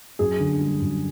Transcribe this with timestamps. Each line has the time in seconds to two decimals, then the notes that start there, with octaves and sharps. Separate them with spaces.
0.19 F#2 G#4
0.40 D3
0.61 G3
0.81 F#2